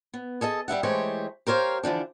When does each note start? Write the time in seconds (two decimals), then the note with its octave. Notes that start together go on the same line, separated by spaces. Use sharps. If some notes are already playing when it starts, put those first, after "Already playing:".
0.14 B3
0.41 G#4 A4 D#5 A5
0.68 G3 G4 E5 F#5
0.83 E3 G#3 A3 G4 C5 C#5
1.47 G4 A#4 C5 C#5 F5
1.83 D3 E3 F3 D4